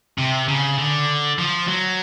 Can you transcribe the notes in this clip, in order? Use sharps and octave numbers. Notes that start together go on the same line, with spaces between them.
C3
C#3
D3
F3
F#3